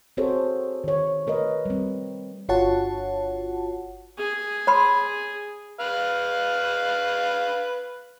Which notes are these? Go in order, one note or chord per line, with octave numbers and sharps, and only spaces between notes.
C4 F#4 G#4 A4 C5 C#5
D#3 C#5
A3 A#4 B4 D#5
G3 C4
G1 F4 F#4 C#5 F#5 A5
G#4
C#5 B5 C6
B4 F5 F6